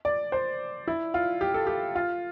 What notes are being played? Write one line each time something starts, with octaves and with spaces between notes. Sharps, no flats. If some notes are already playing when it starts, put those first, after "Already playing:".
D5
C5
E4
F4
G4
A4
G4
F4